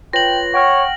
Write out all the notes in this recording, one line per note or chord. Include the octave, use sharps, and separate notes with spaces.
F4 B4 C#5 G5 A#6 F#7
C#5 F#5 G5 F6